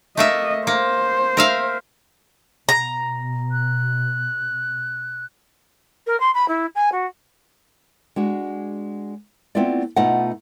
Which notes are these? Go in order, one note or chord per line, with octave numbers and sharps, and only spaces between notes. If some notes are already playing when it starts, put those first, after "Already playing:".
A3 A#3 D#5 E5
A#3 C5
A#4 E5 F5
B2 A#5
F#6
A#4
C6
B5
E4
G#5
F#4
G#3 D4 F#4
A3 B3 C4 E4 F4 D5
B2 A3 D#4 F4 D#5 F#5